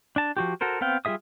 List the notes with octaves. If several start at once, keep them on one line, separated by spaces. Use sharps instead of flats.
D4 A5
F3 F#4 G4
F#4 A4 A#4 C5
B3 C4 F5 G5
G3 F4 G#4 E5 D#6